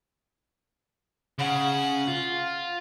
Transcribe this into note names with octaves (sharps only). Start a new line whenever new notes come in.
C#3 F#5
F4